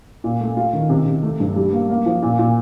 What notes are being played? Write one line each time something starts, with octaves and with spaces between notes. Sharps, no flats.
A#2
A3
F4
D#3
C3
C3
A3
G2
G3
A#3
A#3
F3
A#2
A#2